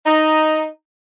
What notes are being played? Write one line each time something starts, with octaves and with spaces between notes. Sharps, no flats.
D#4